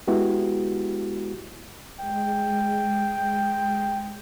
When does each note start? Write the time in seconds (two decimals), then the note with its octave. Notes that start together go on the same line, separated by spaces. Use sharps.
0.07 G#3 B3 E4 F#4 G4
2.00 G#3 G5